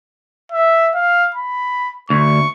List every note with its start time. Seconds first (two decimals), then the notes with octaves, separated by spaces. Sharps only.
0.52 E5
0.95 F5
1.35 B5
2.10 D2 C#6